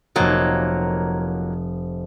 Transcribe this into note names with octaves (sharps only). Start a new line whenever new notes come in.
F1 A#2 F#3 A#3 D#5